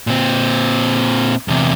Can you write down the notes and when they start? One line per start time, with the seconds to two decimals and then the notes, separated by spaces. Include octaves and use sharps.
0.07 A#2 C4
1.48 E2 C3